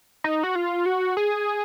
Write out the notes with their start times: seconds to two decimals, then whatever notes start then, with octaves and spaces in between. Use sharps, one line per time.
0.24 D#4
0.43 F#4
0.55 F4
0.86 F#4
1.17 G#4